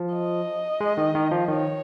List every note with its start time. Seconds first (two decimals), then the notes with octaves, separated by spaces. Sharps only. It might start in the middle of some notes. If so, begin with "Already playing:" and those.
Already playing: F3
0.13 D#5
0.80 G#3
0.97 D#3
1.15 D#3
1.31 F3
1.48 D#3 C#5